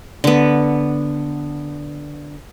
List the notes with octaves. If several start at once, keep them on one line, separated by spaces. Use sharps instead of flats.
D3 B3